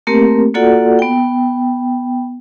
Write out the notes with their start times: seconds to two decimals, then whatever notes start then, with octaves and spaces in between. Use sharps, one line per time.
0.07 A3 A#3 C4 G4 A#4
0.54 A#3 F4 F#4 A4 D5 F#5
0.99 B3 G5